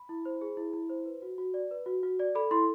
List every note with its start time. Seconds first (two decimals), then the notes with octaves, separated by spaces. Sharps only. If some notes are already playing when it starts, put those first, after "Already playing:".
Already playing: B5
0.09 E4
0.25 C5
0.41 G#4
0.57 E4
0.73 E4
0.89 C5
1.06 B4
1.22 F#4
1.38 F#4
1.54 D5
1.71 B4
1.86 F#4
2.03 F#4
2.19 D5
2.35 A4 B5
2.51 E4 C6